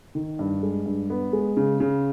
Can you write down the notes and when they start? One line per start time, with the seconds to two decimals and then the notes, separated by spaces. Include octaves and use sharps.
0.15 D#3
0.39 G2
0.63 G#3
0.86 G2
1.10 B3
1.33 G#3
1.57 C#3
1.80 C#3